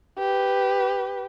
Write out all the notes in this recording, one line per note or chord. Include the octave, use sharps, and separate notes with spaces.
G4 B4